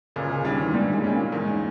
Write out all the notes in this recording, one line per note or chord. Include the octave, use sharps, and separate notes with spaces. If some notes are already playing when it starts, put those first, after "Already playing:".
C#2 A#2 C#3
C#2 C#3
D#2 D#3 G3 C#4
E2 E3
G2 A#2 G3
G#2 G#3
G3 C#4
A#2 A#3
E2 G#2 G#3